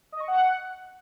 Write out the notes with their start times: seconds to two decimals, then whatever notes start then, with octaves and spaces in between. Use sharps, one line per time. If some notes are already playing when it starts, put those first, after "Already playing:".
0.12 D#5
0.20 C#6
0.28 F#5